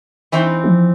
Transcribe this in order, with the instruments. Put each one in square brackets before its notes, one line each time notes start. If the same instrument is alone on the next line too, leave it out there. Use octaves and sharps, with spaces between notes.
[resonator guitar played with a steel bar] E3 C4 D#4
[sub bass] F3